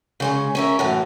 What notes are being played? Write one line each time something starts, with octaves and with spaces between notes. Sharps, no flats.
C#3 G#3 C#4
C#4 A#4 E5
F#2 A2 E3